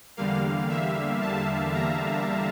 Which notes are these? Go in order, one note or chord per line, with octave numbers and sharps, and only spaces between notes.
E2 D3 G3 A#3 F5
E5
A5
A#5